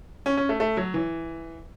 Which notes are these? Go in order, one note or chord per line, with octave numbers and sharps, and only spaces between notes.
C#4
C#4
A3
A3
F#3
E3